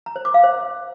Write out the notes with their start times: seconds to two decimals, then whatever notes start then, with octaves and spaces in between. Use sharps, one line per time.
0.06 A#5
0.16 C5
0.25 D6
0.34 F5
0.44 C5